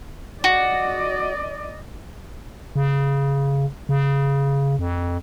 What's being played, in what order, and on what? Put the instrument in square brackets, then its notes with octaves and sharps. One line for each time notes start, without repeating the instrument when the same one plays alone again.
[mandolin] F#4 [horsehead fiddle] D5 D#5
[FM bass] C#3
C#3
F2